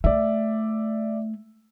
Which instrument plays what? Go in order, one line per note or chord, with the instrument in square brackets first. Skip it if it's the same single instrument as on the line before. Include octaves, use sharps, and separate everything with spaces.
[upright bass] A3 [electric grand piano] D5 E5